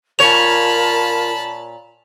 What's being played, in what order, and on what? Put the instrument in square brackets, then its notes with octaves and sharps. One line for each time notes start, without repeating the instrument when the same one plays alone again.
[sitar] A#2 C#5 [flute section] F4 A#4 [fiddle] A5 B5 [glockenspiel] F7